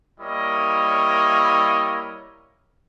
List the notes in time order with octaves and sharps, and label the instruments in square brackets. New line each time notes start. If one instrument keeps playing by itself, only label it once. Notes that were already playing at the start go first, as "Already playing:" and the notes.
[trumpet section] G3 A#3 E4 A#4 C#5 D#5